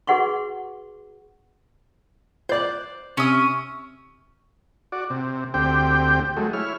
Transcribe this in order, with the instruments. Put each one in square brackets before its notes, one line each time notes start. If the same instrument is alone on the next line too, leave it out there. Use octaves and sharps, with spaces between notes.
[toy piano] F#4 G#4 B4 F#5 C6 C#6
[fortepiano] C5 D5 [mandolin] F#6 G6
[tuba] C3 [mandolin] C#4 E5 D#6
[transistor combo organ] F#4 D5
C3
D2 C4 G4 G5
F#3 G#3 A3
E4 C#5 F6